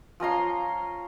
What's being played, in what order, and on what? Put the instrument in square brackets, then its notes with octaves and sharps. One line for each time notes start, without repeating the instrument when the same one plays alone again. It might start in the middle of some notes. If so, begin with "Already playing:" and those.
[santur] F3 C#4 A#5 C6